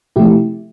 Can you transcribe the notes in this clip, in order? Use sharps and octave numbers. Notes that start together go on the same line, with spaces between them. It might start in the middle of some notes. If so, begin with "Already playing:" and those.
C3 F3 A3 E4 G4